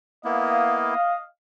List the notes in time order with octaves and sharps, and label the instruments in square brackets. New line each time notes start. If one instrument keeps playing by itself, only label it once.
[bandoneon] A#3 B3 E4 [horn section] D#5 F5